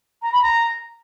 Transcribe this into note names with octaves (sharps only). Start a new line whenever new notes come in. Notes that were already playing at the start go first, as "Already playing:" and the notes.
A#5
B5
A#5